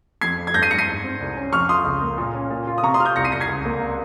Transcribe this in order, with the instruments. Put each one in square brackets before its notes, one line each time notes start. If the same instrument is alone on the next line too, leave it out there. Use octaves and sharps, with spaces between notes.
[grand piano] F2 [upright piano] G#6 C7
[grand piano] F2
[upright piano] G#6
[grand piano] G2 [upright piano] G6 A#6
[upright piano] C7 D#7
[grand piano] G2 [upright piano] A#6 C#7
[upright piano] C7 D#7
[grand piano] G#2
C4
C2
C#4
[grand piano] F2 [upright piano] C#6 F6
[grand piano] F4 [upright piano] C6 D#6
[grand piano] C#2
A#3
A#2
C#4
A#2
F4
[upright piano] D#6
[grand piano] C3 [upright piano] A#5 C#6
[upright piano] C6 D#6
[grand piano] F4 [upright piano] F6
[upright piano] D#6 G6
[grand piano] C2 [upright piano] A#6 C#7
[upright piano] C7 D#7
[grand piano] C2 [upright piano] A#6 C#7
[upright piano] G#6 C7
[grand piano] C#2
A#3